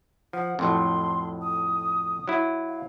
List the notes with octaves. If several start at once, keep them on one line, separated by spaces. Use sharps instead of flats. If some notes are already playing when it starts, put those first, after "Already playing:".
F3 F#5
F2 A2 F#3 C6
D#6
F#3 E4
F5